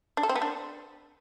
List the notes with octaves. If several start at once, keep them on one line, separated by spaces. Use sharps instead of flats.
D4
A4
C4
B3
D4